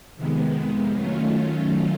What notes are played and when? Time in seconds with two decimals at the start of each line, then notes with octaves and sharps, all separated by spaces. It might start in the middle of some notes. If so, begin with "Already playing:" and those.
0.16 F2 C3 D#3 G#3 B3
0.94 D#3 F#3 A3 C#4 F4